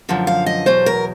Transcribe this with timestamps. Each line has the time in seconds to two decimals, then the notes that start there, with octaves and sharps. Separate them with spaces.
0.09 F#2 D3 F3
0.27 F5
0.46 D#5
0.66 E2 B2 F#3 C5
0.86 A#4